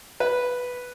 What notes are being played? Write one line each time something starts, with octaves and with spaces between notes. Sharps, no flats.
B4